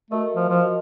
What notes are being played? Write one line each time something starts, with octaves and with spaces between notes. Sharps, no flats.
A3 F#4 A#4 D#5
F3
F3
F#4 A#4 D#5